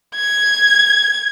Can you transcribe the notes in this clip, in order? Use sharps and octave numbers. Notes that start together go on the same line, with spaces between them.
G#6